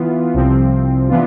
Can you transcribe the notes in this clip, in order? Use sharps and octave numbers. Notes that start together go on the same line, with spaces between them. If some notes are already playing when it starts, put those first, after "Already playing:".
Already playing: E3 B3 F4
C2 C3 F3 C4
E3 B3 D4 F4